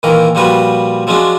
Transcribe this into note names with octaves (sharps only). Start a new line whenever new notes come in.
A#2 D#3 E3 A#3 A#4
A#2 F3 G3 F#4 B4
F3 F#3 G#3 C#4 D4 F4